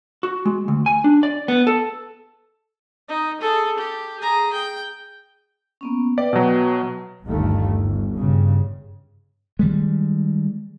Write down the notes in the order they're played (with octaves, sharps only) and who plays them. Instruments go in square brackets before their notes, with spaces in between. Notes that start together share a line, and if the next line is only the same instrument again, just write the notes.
[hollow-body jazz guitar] F#4
G#3
D2
G#5
D4
D5
B3
A4
[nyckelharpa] D#4
G#4 A4
G4
G#4 A#5
G5
[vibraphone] A#3 B3 C#4
[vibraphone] B4 E5 G5 [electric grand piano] D5
[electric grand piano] B2 F#3
[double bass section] G1 D#2 A3
G1
G2 C#3
[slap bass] D#3 G3 G#3